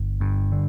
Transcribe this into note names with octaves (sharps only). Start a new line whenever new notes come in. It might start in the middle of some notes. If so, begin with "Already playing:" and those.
Already playing: G1
G2
D3